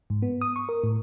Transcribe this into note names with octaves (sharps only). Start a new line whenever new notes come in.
G#2
B3
D#6
C#6
A#4
A2